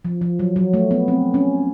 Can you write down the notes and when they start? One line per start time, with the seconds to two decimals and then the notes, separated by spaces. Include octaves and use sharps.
0.05 F3
0.21 F3
0.39 F#3
0.56 F#3
0.74 A3
0.91 B3
1.08 C4
1.34 C#4